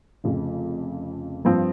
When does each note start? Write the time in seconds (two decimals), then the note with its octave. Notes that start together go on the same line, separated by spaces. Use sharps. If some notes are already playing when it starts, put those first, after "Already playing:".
0.24 F1 F2 C#3 F3
1.45 G2 F3 C4